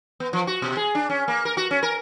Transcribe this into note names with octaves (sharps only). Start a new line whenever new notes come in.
B3
F3
F#4
B2
G#4
D4
C#4
A#3
A#4
F#4
C#4
A#4